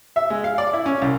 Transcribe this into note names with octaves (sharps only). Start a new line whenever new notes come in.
E5
G#3
F5
D5
E4
C#4
C2